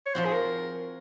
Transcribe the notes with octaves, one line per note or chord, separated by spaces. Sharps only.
C#5
F3 C4 F#4 C5
G#4
A#4